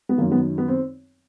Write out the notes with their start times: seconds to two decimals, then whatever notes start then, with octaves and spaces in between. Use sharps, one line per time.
0.09 B3
0.18 F#2 D#3 A#3
0.32 B3
0.58 B3
0.68 C4